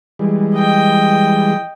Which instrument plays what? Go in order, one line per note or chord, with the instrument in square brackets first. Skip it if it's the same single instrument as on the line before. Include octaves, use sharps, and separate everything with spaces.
[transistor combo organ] E3 G3 G#3
[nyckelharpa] D#5 G5